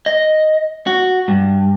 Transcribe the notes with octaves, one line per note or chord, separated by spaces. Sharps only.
D#5
F#4
G2